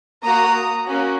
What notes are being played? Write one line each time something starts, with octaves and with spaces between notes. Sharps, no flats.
A#3 F#4 A#5 D#6
A#3 C#4 F#4